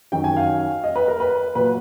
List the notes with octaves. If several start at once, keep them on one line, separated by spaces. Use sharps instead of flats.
F#2 D#3 F#3 G5
G#5
F5
D#5
B4
A#4
B4
A#2 F#3 B4